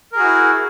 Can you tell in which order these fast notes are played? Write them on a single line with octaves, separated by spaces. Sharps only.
A#4 G#4 F#4 E4